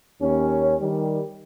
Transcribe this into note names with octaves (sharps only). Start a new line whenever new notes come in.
D#2 C#4
D#3 G3